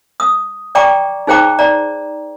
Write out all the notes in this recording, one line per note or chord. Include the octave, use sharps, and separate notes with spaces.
D#6
D5 G5 A#5 C#6 D6
D#4 G#4 C5 G5 A#5 D6
D5 A#5